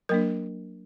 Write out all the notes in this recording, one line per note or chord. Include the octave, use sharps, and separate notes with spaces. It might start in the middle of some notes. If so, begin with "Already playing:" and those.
F#3 A#3 D4 A#4